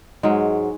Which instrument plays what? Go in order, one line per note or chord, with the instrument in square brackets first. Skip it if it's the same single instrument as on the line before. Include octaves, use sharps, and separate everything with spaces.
[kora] G#2 F#3 G#3